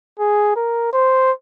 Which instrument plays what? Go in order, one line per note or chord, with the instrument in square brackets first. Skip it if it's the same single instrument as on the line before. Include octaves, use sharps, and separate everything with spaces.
[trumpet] G#4
A#4
C5